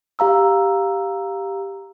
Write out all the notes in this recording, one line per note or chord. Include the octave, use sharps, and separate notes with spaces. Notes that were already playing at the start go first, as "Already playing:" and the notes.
G4 F5 A#5 E6